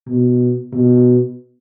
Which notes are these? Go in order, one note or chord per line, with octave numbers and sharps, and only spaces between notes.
B2
B2